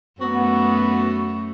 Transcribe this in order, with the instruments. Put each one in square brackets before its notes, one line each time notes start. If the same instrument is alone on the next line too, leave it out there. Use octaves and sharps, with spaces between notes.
[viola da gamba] F#2 A3 [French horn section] B3 [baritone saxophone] F#4